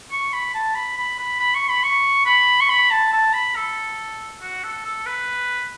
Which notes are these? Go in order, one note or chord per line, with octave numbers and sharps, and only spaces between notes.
C#6
B5
A5
B5
B5
B5
B5
C#6
B5
C#6
B5
C#6
B5
A5
A5
B5
A4
F#4
A4
A4
B4